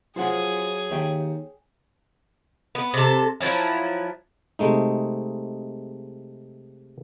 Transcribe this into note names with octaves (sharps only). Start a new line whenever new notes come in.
F#3 F4 G#4 C5 F#5 G#5
D#2 C#5 E5 G5
B3
C3 A4
F3 F#3 E4
C3 G#3 A3 D#4